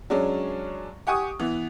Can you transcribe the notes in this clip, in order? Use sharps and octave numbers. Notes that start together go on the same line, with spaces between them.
F#3 G#3 C#4 D4
G4 F#5 G#5 C#6 D#6
E3 B3